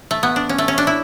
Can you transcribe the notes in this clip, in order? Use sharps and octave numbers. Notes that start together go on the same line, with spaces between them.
A3
B3
D4
C#4
A3
C#4
D4
E4